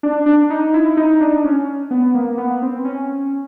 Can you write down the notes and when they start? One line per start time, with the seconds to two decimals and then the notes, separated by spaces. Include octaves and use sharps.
0.03 D4
0.26 D4
0.50 D#4
0.74 E4
0.97 D#4
1.21 D4
1.45 C#4
1.91 B3
2.15 A#3
2.38 B3
2.62 C4
2.85 C#4